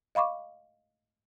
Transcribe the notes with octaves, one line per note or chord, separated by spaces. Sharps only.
D#5 F5 B5 C#6 D6